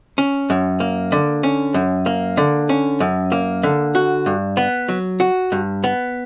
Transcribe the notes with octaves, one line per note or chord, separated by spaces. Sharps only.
C#4
F#2
A#3
D3
C#4
F#2
A#3
D3
C#4
F#2
A#3
D3
F#4
G2
B3
F#3
F#4
G2
B3